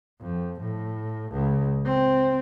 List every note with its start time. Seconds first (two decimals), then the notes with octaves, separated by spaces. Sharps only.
0.21 F2
0.60 A2
1.32 C#2
1.85 C4